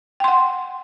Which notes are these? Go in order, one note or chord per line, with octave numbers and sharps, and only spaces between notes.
F#5 G5 C6